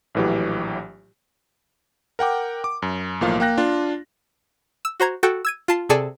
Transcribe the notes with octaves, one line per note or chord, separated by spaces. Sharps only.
A#1 A2 E3 F#3 G4
A#4 F#5 G5 D6
D6
F#2
B1 A2 F3 A#3 F4 F5
A#3 F5 G5 F#6 A#6
D4 F4
E6
F#4 C5 A#5 G#6
F#4 A4 G5
E6 G#6 D#7
F4 A5 C7
C3 G#4 A4 D5 G#5 E6